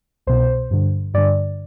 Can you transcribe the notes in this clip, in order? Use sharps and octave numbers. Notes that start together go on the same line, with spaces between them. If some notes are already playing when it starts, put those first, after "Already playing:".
C2 B2 C5
G2 D3
G2 D3 D5